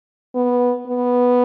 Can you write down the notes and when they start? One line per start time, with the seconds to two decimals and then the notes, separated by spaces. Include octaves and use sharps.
0.35 B3
0.88 B3